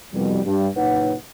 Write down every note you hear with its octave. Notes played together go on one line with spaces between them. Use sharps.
C2 F2 B2 G3
G2
F#1 A#2 D#4 B4 C#5 F#5